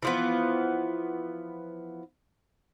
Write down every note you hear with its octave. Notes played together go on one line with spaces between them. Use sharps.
E3 F3 B3